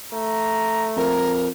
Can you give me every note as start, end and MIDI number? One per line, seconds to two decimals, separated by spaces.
0.13 1.24 57
0.13 0.91 82
0.97 1.50 41
0.97 1.48 70
0.97 1.33 82